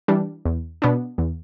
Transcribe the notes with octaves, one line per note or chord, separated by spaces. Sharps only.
E3 G3 D4
E2
B2 B3 D4
E2